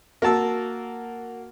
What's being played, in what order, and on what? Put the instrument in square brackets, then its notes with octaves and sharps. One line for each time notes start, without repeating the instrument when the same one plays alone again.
[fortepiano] A#3 F#4 A5 E6